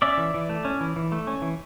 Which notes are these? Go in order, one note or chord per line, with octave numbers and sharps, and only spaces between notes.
C#4 D5 E5
E3
E3
A3
C#4
E3
E3
A3
C#4
E3